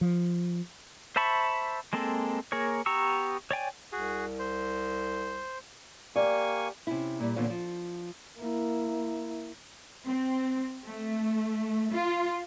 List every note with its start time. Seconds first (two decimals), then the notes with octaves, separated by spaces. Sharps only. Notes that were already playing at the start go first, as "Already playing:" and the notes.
0.01 F3
1.16 C5 E5 A5 B5 C#6
1.93 G#3 A#3 C4 A4
2.52 A#3 G#4 A#4 C#5
2.86 B3 G4 A#5 C#6 E6
3.51 C#5 D5 G5 G#5
3.92 C2 F#4 G#4
4.39 C5
6.16 A#3 G4 D5 G#5 C#6
6.87 C3 C#4 E4
7.20 A#2 G3
7.36 E2 A#2 D3 B3 F4 C#5
7.50 F3
8.38 A#3 E4
10.06 C4
10.85 A3
11.92 F4